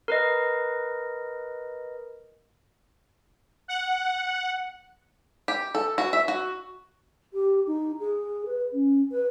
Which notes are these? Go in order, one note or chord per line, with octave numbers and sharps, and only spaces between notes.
A#4 B4 D#5
F#5
G4
A4
F#4
E5
F#4
G4
D#4
G#4
B4
C#4
B4